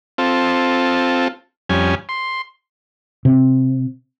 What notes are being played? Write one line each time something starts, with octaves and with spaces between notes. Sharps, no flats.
C4 F4 A4
F2 G3 C#4 G#5
C6
C3